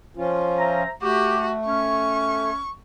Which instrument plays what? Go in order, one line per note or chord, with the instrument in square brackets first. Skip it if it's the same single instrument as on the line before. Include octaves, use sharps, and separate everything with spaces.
[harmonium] F3 C#4 F4
[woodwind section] C5 E5 A#5
[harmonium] A3 [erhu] F#4 [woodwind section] G4
[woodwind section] C#4 [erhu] C#6